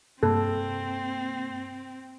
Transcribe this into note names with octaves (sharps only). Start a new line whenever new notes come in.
G2 C3 A#3 C4 A4